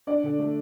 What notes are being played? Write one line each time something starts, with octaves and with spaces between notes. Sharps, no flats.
D4 D5
D3
A3